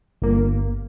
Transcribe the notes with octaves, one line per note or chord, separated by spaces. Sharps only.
G1 A#3